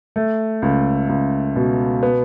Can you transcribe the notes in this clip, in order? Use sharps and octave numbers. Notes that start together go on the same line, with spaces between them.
A3
C#2
C#2
B2
B3